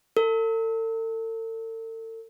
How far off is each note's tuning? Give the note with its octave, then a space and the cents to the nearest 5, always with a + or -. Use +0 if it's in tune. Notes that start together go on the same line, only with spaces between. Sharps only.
A4 +40